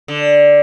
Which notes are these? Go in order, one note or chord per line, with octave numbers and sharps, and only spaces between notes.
D3